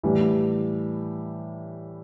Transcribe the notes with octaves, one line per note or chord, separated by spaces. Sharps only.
A2 E3 G3